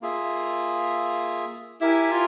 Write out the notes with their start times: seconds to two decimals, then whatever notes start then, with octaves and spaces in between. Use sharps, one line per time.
0.02 A#3 F4 G#4 E5
1.81 E4 G4 A#4 E5 G#5
2.11 F4